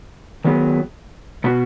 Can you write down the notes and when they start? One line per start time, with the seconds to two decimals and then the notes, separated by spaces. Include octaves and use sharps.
0.45 D#3 F#3 B3 G#4
1.44 B2 B3 F#4